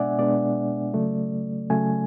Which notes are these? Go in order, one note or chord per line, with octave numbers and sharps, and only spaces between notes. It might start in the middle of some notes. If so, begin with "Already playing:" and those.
Already playing: B2 G#3 B3 D4 D5 E5 F#5 G#5
B2 G#3 B3 D4 D5
C#3 F#3 A3
C#3 F#3 A3 G#5